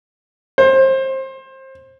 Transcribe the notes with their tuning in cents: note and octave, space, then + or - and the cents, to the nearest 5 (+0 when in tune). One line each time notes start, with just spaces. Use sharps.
C5 +25